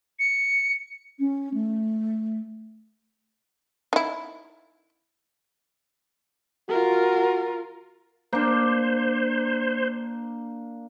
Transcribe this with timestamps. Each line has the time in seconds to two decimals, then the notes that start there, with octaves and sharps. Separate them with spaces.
0.19 C#7
1.19 C#4
1.54 A3
3.93 D#4 E4
6.69 F4 F#4 A#4
8.33 A#3 D4 C5